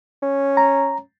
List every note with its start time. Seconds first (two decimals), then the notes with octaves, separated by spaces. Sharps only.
0.23 C#4
0.57 A#5